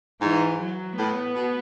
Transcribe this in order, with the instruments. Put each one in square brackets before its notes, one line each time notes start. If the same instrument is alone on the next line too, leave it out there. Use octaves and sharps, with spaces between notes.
[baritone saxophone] G#2 [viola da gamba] E3
[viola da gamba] F#3
[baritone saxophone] A2 [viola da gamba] B3
[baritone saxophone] B2